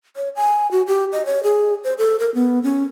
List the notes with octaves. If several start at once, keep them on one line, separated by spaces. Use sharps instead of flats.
C#5
G#5
F#4
G4
D#5
C#5
G#4
C5
A4
A#4
B3
C#4